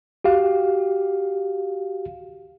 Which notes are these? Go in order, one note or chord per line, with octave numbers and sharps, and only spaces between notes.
F#4 G4 F5